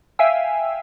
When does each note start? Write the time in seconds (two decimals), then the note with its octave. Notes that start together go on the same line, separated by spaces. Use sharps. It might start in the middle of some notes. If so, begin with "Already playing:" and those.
0.19 E5 F5 G5 G#5 E6